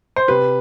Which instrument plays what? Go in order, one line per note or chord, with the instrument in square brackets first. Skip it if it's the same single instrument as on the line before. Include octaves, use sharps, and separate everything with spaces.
[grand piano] C5
C3 B4